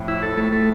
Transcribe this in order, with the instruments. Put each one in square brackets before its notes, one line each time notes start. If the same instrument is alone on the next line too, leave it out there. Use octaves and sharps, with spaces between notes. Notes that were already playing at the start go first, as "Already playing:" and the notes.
Already playing: [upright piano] F2 A2
[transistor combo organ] E4
A4
A3
A3